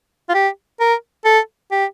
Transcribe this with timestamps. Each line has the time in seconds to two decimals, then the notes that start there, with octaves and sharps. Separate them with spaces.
0.29 F4
0.34 G4
0.80 A#4
1.25 A4
1.71 G4